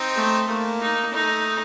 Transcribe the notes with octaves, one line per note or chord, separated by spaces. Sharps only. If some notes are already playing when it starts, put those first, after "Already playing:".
Already playing: C4 D#4
A3
A3 A#3
D#4
A3 D#4